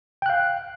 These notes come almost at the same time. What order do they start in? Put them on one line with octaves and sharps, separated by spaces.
G5 F#6 F5